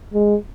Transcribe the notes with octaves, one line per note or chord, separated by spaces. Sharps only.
G#3